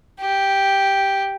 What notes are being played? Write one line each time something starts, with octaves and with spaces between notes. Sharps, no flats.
G4